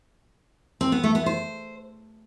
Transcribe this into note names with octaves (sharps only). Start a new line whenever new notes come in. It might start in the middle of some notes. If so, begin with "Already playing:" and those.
C4
B3
A3
B3
C5